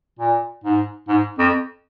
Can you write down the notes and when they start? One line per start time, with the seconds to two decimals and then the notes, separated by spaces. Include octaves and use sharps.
0.19 A#2
0.64 G#2
1.08 G#2
1.38 F2